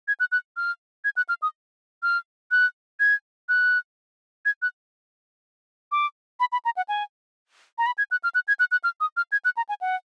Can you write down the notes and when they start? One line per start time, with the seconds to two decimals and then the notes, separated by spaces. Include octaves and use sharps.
0.08 G#6
0.20 F#6
0.32 F#6
0.57 F6
1.04 G#6
1.17 F#6
1.29 F6
1.42 D#6
2.03 F6
2.51 F#6
3.00 G#6
3.49 F#6
4.45 G#6
4.62 F#6
5.92 D6
6.40 B5
6.52 B5
6.65 A#5
6.77 F#5
6.89 G#5
7.78 A#5
7.86 B5
7.98 G#6
8.11 F#6
8.24 F6
8.35 F#6
8.48 G#6
8.60 F#6
8.71 F#6
8.84 F6
9.00 D#6
9.17 F6
9.32 G#6
9.45 F#6
9.57 A#5
9.69 G#5
9.81 F#5